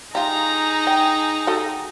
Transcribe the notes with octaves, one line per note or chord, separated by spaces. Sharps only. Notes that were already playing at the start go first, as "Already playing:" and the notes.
D#4 F4 G4 G#4 A#5
G5
F#4 G4 A4